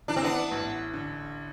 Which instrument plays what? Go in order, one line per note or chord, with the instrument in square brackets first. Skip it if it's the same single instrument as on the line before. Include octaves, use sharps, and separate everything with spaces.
[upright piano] E3 [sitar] D4
[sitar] C4
B3 D4
[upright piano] A1
D3